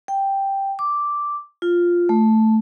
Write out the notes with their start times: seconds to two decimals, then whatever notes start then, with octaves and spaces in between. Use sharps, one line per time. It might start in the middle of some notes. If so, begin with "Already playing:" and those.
0.08 G5
0.79 D6
1.62 F4
2.09 A3